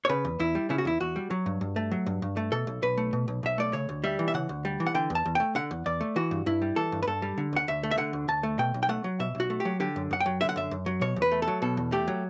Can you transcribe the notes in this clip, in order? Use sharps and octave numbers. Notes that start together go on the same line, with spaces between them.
C#5
C#3 B4
E2
E2 E4
G3
C#3 E4
F#4
E2 E4
E2 F#4
G3
F#3
G2
G2
A3
F#3
G2
G2
A3
B2 A4
B1
B1 B4
A3
B2
B1
B1 E5
A3 D5
C#3 C#5
D2
G3 E5
E3
E5
C#3 F#5
D2
G3
E3
F#5
D3 G5
E2
A5
E2
A3 G5
D3 F#5
E2
E2 D5
A3
E3 F#4
G2
G2 E4
G3
E3 A4
G2
B4
G2 A4
G3
D3
D2 F#5
D2 E5
A3
E5
D3 F#5
D2
D2 A5
A3
B2 G5
B1
G5
A3 F#5
F#3
B2 E5
B1
F#4
A3
G4
F#3
D3 G4
F#2
F#2 F#5
G5
F#3
D3 E5
F#5
F#2 E5
F#2
F#3
B2 C#5
E2
B4
A3
A4
F#3
B2 A4
E2
A3 G4
F#3